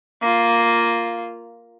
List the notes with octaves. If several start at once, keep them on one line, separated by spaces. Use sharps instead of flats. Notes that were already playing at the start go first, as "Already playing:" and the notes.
A#3 F4